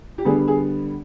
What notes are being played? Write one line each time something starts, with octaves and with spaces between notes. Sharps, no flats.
G4
D3 G3 B3 G#4
G#4